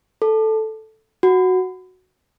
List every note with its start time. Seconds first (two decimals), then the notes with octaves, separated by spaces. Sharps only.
0.22 A4
1.23 F#4